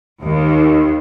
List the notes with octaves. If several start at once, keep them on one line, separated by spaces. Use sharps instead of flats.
D#2